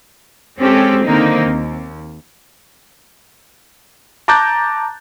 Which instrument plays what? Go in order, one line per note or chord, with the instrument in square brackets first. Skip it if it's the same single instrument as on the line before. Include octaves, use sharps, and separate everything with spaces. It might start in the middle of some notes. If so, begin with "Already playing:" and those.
[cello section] G#3 C4 C#4 G4 A4
D3 D#3 A#3 C4 D#4
D#2
[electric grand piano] A5 A#5 D6 F#6 G6 A6